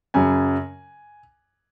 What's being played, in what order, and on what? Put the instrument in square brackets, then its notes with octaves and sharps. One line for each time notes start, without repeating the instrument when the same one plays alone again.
[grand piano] F#2 C#3 F#3 G#5